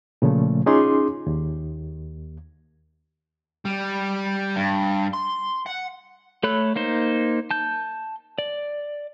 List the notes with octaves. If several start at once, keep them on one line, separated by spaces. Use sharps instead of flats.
A#2 C#3 F3 A3
C#4 D#4 F4 G#4 C6 D6
D#2
G3
G2
C6
F#5
A3 A4 C#5 B5 F#6
A#3 D#4 C5
A5 G6
D5